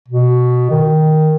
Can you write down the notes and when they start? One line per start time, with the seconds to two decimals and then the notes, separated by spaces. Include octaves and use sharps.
0.08 B2
0.71 D#3